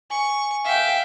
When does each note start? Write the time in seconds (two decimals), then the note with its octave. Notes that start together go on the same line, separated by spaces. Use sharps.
0.10 G#5 C#6
0.65 E5 F5 G5